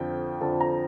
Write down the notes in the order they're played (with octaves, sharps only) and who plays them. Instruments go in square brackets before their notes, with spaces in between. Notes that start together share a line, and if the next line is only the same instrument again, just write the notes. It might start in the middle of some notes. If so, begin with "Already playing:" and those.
Already playing: [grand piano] F2 D3 F3 G5
F2 D3 F3 A5
A#5